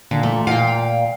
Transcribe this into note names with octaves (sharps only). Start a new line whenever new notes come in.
A#2 D3
A3
A#2 F5 G5